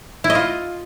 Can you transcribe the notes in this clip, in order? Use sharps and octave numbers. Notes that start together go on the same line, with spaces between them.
E4
D#5
F4